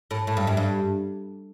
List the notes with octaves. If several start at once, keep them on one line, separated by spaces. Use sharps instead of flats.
A2
A2
G2
F#2
G2